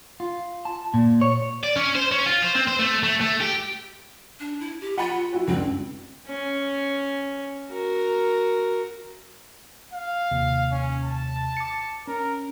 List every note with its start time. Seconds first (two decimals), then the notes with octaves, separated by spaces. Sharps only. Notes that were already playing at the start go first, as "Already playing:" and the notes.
0.20 F4
0.65 A5
0.94 A#2
1.21 C#5
1.64 D5
1.76 C#4
1.95 C5
2.12 C#4
2.26 F4
2.42 C5
2.55 C4
2.68 C5
2.79 A3
3.03 A3
3.21 A3
3.41 G4
4.40 D4
4.60 E4
4.81 G4
4.98 F4 F#5 B5
5.33 E4 F#4
5.48 C#2 G2 C4
6.28 C#4
7.70 F#4 A#4
9.93 F5
10.31 D#2 C3
10.71 C#4
11.04 A5
11.57 D6 C#7
12.07 C#4 A#4